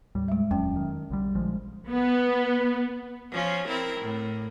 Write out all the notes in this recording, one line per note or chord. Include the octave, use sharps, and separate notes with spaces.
D#2 A2 G3
G#3 E5
D#1 F2 F#3 C#4 G5
D#3
B1 D3 G3
A#1 F3 G#3
B3
F3 C#4 F4
C4 E4 A#4
A2